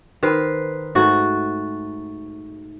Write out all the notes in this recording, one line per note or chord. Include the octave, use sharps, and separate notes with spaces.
D#3 B4 C5
G#2 A3 F#4